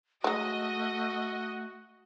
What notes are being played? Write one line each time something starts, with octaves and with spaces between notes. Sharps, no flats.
F#3 G#3 A3 F#4 D#5